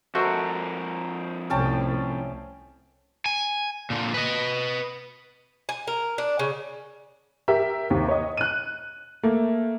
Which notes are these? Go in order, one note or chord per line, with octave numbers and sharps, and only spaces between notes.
F2 A3 F#4 A#4 C5 D#5
C2 A2 C#4 G5 A5
G#5
A#2 D3
B4 D#5
G#5
A#4
D4
C#3
G4 A#4 E5
D#2 C3
C#5 D#5
F#6 D#7
A3 A#3